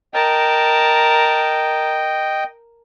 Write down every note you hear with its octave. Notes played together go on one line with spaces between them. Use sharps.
A#4 D#5 G5 A5